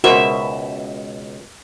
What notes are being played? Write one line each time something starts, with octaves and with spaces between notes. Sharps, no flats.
C#2 B2 F#4 A#4 C5 E5